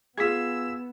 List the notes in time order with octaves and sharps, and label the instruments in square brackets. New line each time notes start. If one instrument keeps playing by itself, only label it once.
[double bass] B3 [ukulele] F4 G#4 [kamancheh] E6 [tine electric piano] G#6 B6